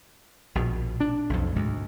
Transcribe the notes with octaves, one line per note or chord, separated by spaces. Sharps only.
A#1 B2
D4
B1 F2
D2 G#2